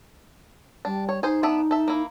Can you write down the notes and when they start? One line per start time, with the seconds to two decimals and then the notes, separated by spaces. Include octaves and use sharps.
0.85 G3 D4
1.09 C#5
1.23 D#4 G#4 C5
1.43 B3 D4 E5
1.71 A4 E5
1.88 A#3 E4